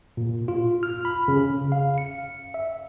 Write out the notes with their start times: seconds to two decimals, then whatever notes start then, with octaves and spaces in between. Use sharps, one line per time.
0.17 A#2
0.48 F4
0.83 F6
1.05 B5
1.28 C#3
1.72 F5
1.98 C#7
2.54 E5